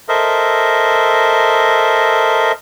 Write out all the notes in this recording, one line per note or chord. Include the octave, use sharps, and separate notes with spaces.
A4 A#4 C5 D#5 E5